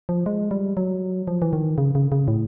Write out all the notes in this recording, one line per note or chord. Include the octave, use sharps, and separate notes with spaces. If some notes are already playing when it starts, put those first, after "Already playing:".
F3
G#3
G3
F#3
F3
E3
D#3
C#3
C#3
C#3
A2